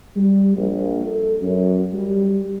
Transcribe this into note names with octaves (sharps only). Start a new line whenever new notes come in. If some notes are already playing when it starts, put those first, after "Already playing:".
G3
A#1
A4
F#2
G3